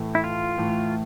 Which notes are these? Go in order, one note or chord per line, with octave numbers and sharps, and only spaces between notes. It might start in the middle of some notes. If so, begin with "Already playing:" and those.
Already playing: A2 E3 A3
E4
F4
A2 E3 A3